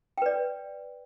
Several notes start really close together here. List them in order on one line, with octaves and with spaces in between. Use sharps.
G5 B4 D5